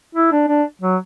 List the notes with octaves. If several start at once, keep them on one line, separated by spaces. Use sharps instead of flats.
E4
D4
D4
F#3